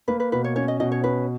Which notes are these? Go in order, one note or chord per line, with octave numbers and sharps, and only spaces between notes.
A#3 B4
B4
B2 B4
C#5
C#4 C#5
D#5
B2 D#5
C#5
C#4 B4